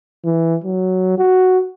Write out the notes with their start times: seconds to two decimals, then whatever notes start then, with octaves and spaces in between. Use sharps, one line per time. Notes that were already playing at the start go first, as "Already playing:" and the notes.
0.25 E3
0.64 F#3
1.18 F#4